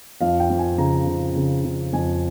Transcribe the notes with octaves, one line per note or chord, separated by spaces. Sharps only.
F2 F5
G5
F2
G#5
C#3 A#5
C#3
C#3
C#3
F2 G#5